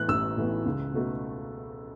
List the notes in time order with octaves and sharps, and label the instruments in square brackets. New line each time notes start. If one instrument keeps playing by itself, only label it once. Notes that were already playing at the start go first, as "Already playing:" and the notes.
Already playing: [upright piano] A2 E3 B3 [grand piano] F#6
[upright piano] A1 [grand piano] E6
[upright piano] A2 E3 B3
C#2
B2 A3 F#4 A4